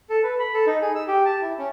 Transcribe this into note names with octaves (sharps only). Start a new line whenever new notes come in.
A4
B4
B5
A4
D#4
G#4
E6
G4
A5
E4
C#4